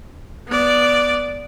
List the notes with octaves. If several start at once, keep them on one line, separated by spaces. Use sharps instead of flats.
B3 D5